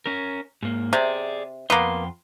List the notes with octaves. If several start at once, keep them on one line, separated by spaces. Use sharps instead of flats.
C#4 A#4
G#2 A#3
C3 G#4 D5
F2 A#3 B3 C6